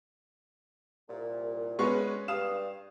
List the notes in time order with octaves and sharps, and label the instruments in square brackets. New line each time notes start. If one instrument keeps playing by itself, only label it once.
[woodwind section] C2 A#2
[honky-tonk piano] G#3 B3 [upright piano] C#4 B4 C#6
[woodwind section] G2 [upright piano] F5 D#6 [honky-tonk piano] E7